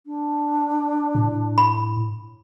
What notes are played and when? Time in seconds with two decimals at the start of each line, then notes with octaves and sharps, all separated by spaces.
0.06 D4
1.15 A2
1.58 B5